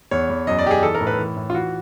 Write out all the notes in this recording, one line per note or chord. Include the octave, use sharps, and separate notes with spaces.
E2 C#5
E2
F#2 D#5
D5
F#2 G4
G#4
E3 A4
A#4
A2
B4
E3
A2
F4
E3 F#4